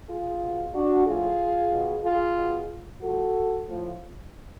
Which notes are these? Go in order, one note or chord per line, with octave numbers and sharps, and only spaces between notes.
F4 G#4
B2
D4 F#4
A2 F3 F4 G#4
B2
F4 G#4
B2
A2 F3 F#4 A4
A2 F3